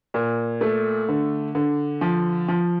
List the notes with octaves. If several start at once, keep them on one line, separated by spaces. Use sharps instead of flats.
A#2
A3
D3
D3
F3
F3